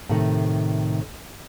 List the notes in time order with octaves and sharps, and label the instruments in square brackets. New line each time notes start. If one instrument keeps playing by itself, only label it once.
[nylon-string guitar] A2 C3 D#3 A3